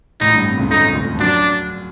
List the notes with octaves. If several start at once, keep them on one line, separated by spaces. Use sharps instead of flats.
A1 A2 D#4
G2
C3
C#2 C#3
D2 D3 D#4
D2 D3
F3
F#2 F#3 D4